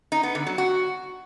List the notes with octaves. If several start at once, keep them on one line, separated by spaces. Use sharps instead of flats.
D#4
B3
D3
F#3
F#4